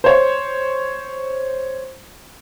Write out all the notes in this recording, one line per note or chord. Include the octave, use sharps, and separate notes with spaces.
C5 C#5